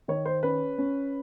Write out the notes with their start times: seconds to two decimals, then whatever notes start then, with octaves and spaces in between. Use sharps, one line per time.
0.08 D#3 C#5
0.25 C5
0.43 C#4 B4
0.78 C#4